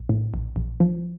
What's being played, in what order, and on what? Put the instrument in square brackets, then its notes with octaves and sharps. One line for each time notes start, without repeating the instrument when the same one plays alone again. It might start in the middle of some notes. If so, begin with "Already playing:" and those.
Already playing: [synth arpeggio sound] A#1
A2
A#1
A#1
F3